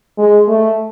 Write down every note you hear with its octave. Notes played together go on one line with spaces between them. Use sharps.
G#3
A3